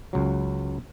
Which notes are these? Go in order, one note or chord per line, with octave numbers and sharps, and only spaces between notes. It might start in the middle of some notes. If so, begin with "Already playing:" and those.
C#2 F#3